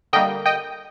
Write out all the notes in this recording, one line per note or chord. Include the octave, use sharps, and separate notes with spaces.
D3 G3 A#3 D#5 G5
D#5 G5